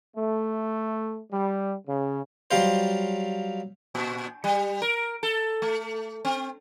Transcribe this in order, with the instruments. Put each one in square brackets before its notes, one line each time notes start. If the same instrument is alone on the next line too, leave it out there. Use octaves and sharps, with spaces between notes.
[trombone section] A3
G3
C#3
[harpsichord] F#3 G3 F4 C5
[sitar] A#2
G3
A#4
A4
A3
C4